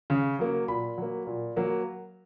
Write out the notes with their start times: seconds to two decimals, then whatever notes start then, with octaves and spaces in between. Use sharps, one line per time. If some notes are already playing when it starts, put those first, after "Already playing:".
0.10 C#3
0.39 F#3 A#3
0.68 A#2 B5
0.98 F#3 A#3
1.27 A#2
1.56 F#3 A#3